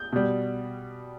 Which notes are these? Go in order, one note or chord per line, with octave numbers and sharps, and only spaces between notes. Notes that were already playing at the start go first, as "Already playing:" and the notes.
Already playing: G6
B2 G3